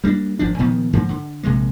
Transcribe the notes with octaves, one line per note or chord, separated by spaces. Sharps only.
G3 A#3 B3 D4
G#1 F3 D4
A#2 D#3 F3 B3
G#2 D3 F3 A#3
D3
A#1 C3 G#3 A#3